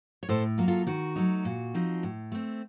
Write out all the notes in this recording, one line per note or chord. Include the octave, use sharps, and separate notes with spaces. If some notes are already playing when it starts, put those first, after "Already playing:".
C#5
A2 A4 C5
F#3 A#3 F4
F4 A4
D#3 F#4
F#3 A3 D#4
A#2
F3 C4 D#4
A2
A3 C4